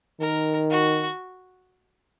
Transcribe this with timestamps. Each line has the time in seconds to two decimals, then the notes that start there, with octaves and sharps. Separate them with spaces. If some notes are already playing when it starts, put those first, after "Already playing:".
0.21 D#3 A#4
0.70 F#4